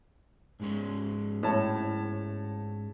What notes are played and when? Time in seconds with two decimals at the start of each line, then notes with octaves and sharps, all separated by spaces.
0.60 G#2 G#3 C#4
1.43 A2 C#5 A5